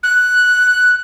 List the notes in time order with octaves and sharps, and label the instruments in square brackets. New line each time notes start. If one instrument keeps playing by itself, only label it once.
[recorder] F#6